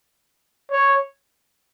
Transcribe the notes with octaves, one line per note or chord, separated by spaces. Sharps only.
C#5